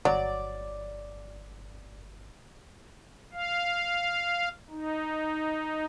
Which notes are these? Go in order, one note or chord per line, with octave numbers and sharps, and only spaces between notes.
G1 F#3 D5
F5
D#4